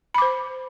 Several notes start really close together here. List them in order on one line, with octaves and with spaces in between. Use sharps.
B5 D6 C5